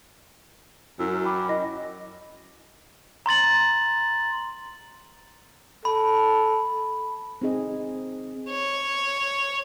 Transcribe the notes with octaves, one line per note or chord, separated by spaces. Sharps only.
F#2 E4 E6
G5 B5 D6
E4 D#5 A#6
A#5 C6 A6 F#7
A4 B5
C4 D#4 G#4 D#5
C#5